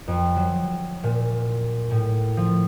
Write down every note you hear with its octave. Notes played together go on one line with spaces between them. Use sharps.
F2
F#3
A#2
A2
F3